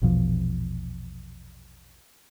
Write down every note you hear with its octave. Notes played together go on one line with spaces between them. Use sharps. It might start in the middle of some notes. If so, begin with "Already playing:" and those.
A#1 E2 B2 F3